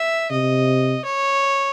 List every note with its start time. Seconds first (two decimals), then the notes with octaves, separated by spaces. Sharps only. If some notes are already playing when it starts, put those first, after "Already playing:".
Already playing: E5
0.31 C3 D#5
1.05 C#5